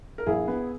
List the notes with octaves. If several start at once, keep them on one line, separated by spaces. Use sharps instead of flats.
A#4
A#1 E4 G#4
B3